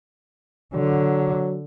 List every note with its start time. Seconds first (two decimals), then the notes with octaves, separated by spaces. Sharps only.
0.74 D3 F#3